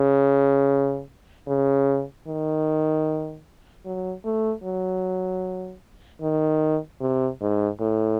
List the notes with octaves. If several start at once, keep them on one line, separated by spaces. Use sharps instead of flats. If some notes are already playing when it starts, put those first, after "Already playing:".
Already playing: C#3
C#3
D#3
F#3
A3
F#3
D#3
C3
G#2
A2